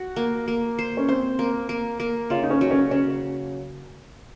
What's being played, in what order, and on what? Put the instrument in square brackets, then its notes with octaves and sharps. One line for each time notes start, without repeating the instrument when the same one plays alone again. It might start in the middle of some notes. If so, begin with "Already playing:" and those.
Already playing: [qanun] F#4
A#3
A#3
C5
[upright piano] C#4
[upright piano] C4 [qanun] C5
[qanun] A#3
A#3
A#3
[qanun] C#3 [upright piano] F4
[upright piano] D#4
C#4
[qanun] F#3
[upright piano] C#4
[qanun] C#3 [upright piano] C#4